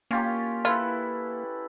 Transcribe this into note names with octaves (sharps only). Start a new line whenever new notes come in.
A#3 C#4 F4 G4
E4 F4 A4 B4